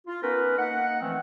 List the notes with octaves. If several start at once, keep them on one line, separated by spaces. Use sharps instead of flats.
F4
B3 C#4 D#4 A#4 B4
A#3 D#4 D#5 F#5
E3 F3 A3 C4 C#4